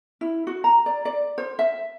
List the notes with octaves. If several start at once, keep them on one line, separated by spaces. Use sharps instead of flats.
E4
F#4
A#5
D5
D5
C5
E5